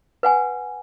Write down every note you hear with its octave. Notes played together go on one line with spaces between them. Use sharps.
B4 F#5 G#5